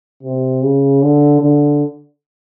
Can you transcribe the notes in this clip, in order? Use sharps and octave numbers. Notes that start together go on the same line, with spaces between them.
C3
C#3
D3
D3